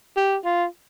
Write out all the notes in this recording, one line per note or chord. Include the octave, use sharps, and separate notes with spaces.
G4
F4